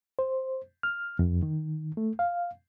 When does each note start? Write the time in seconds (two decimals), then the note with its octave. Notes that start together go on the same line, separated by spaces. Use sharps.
0.19 C5
0.83 F6
1.19 F2
1.43 D#3
1.97 A3
2.19 F5